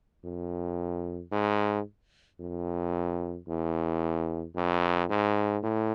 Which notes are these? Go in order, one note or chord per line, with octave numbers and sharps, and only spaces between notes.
F2
G#2
F2
E2
F2
G#2
A2